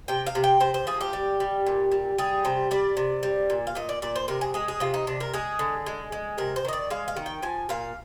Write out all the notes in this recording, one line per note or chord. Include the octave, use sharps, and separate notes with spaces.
C3 G5
F5
C3
G5
C3 C5
C5
F3 G#4
G4
G3
G3
A#2
G3
G3 G#4
C3 C5
G3 D5
C3
G3
A#2
F5
A#2 D#5
D5
A#2 D5
C5
C3 A#4
G#4
G#3 G#4
G#4
C3 F4
D#4
C3 D4
A#4
G#3 G#4
D3
G#3
G#3
C3 A#4
C5
D#3 D#5
D5
G#3 F5
F5
D#3
G5
F3 G#5
A#2 F5